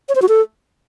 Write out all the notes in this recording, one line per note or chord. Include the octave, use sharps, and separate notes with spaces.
C#5
C5
F#4
A4